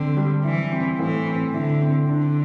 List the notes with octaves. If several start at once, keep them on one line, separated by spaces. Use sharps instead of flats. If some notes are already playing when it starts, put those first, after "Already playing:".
Already playing: D3 C4
G3
E3 E4
C4
A2 E3
C4
D3 E4
C4
D3 D4